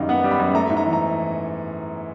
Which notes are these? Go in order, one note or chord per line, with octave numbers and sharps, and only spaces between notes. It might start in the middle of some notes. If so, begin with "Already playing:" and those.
Already playing: F#2 D#3 G3 D#5 F5
B3 F#5
G3
B5
F#2
A3 A#5
G#2
A#5
E3
A#5